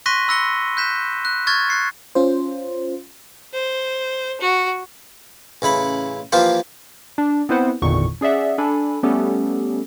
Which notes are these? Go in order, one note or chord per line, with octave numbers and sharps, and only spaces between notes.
C6 C#6 F#6 A#6 B6 D#7
B5 E6 F#6 A#6 C#7 G7
F#6 G6 B6 E7
F#6
C#6 F6 F#6 G#6 A6
F#6 A6 C7 C#7
C#4 F4 C5
C5
F#4
A1 C#3 E4 B5
E3 F3 A#3 F4 G4 C5
D4
B3 C4 E4 B4 C5 F#5
G#1 E2 A#2 D3 D#3 C#6
C#4 G#4 D5 E5 F#5
D4 A4 G#5 B5
G3 A3 B3 C#4 G4 A4